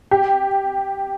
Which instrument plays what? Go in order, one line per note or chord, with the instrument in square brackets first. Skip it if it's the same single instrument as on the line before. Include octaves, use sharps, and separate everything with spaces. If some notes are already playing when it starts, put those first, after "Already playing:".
[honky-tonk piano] G4